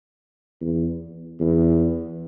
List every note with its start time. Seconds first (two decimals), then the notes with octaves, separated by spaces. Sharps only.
0.61 E2
1.40 E2